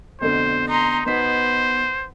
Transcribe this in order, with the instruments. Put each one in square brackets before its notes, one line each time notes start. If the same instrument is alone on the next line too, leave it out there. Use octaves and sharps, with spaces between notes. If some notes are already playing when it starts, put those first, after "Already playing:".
[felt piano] F1 B2 D3 [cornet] C5
[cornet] D#4 [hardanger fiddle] A#5 C6
[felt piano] B2 D#4 B6 [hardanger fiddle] B3 [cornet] C5